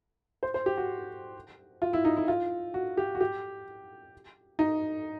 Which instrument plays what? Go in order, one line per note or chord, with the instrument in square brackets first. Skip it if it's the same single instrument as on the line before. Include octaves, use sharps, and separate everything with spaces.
[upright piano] C5
C5
G4
F#4
F4
E4
D#4
E4
F4
F#4
G4
F#4
G4
D#4